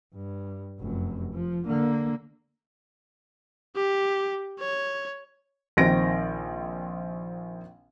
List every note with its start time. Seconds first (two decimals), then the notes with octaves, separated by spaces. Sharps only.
0.15 G2
0.79 F1 F#2
1.34 F3
1.66 D3 A#3
3.76 G4
4.60 C#5
5.77 A#1 D#3 C4 A#6 D7